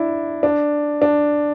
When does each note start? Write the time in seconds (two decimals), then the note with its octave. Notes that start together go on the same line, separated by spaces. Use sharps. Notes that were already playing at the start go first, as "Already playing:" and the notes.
Already playing: D4 E4
0.43 D4
1.02 D4